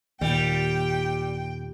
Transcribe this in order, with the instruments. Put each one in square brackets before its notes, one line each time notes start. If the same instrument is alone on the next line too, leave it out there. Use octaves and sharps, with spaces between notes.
[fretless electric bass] D#2 A#2 [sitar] G3 [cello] G5